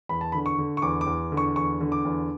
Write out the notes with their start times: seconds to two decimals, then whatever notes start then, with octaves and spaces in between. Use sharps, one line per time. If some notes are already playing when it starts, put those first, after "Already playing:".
0.09 E2 B5
0.21 A5
0.32 D3 B5
0.46 C#6
0.58 D3
0.77 C#6
0.82 E2 D6
1.01 D6
1.07 E2
1.32 D3
1.37 C#6
1.56 E2 C#6
1.81 D3
1.92 D6
2.05 E2